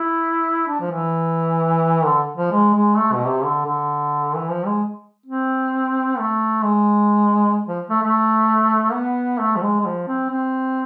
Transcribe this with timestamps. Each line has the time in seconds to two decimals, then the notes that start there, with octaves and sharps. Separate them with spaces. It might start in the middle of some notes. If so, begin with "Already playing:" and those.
Already playing: E4
0.68 D4
0.81 F3
0.91 E3
2.06 D3
2.37 F3
2.52 G#3
2.74 G#3
2.97 A3
3.13 B2
3.27 C3
3.44 D3
3.66 D3
4.36 E3
4.50 F3
4.66 G#3
5.26 C4
6.19 A3
6.64 G#3
7.67 F3
7.90 A3
8.02 A3
8.93 B3
9.40 A3
9.56 F3
9.63 G#3
9.80 G#3
9.86 F3
10.08 C4
10.30 C4